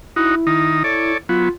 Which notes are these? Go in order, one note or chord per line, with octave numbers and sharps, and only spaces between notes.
D#4 E4 F#4
D#3 D#4
A4 C#5 D5
F#3 B3 F4